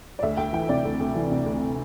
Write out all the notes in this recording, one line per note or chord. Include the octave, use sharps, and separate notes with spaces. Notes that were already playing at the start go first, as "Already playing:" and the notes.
D5
D2 E5
D2 G5
E3 G5
C3 D5
D2
D2
E3
C3
D2